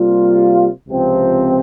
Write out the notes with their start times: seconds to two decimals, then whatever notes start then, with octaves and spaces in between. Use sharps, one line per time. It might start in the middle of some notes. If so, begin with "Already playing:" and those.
Already playing: C3 G3 A#3 F4
0.89 C#2 C3 F3 C4